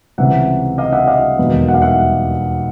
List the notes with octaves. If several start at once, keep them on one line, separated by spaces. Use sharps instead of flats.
C#2 C3 E3 E5 F#5
D#5 F5
E5 F#5
D#5 F5
E1 D#2 D#3 F#3 B3
F#5
F5
E5 F#5